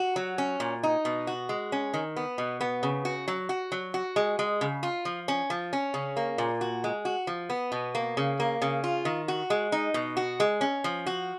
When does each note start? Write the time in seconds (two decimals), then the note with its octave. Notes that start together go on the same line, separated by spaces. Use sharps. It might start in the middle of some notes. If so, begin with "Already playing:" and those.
Already playing: F#4
0.16 F#3
0.38 C#4
0.60 A#2
0.83 D#4
1.05 B2
1.27 F#4
1.49 G#3
1.72 C#4
1.94 D#3
2.16 B3
2.38 B2
2.61 B3
2.83 C#3
3.05 F#4
3.28 F#3
3.49 F#4
3.72 F#3
3.94 F#4
4.16 G#3
4.39 G#3
4.61 C#3
4.83 F4
5.05 F3
5.28 C#4
5.50 F3
5.73 C#4
5.94 C#3
6.17 A#3
6.38 A#2
6.61 F#4
6.84 G#3
7.05 F#4
7.27 F3
7.50 B3
7.72 B2
7.95 A#3
8.17 C#3
8.40 A#3
8.62 C#3
8.84 F4
9.05 D#3
9.28 F#4
9.50 G#3
9.72 D#4
9.94 B2
10.17 F#4
10.40 G#3
10.61 C#4
10.84 F3
11.06 F#4